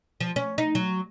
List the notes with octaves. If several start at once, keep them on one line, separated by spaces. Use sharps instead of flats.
F3
C#4
D#4
F#3